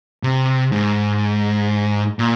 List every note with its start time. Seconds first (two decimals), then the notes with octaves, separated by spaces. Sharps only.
0.23 C3
0.72 G#2
2.19 A#2